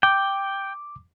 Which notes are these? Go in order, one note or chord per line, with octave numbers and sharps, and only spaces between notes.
G5 D6